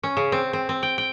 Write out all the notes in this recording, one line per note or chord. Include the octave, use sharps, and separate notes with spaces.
C#4
C#3
C4
C4
C4
G5
G5